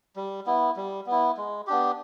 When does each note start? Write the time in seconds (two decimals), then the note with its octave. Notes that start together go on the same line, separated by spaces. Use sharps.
0.16 G3
0.46 B3 E4
0.76 G3
1.07 B3
1.12 E4
1.37 G#3
1.67 B3 D4 G4